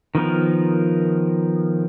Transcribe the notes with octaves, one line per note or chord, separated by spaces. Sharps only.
D#3 F3 B3 A#4